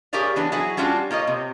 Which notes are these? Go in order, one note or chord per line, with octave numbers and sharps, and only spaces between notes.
G4 G#4 A#4 C#5 D5 F5
E3 B3 D4 B4
F#3 E4 F#4 G#4
G3 C#4 D4 F4 F#4
A#3 F4 C#5 D#5
C3